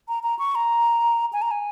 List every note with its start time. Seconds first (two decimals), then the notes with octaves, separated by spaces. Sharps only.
0.08 A#5
0.23 A#5
0.39 C#6
0.55 A#5
1.33 G#5
1.42 A#5
1.51 G#5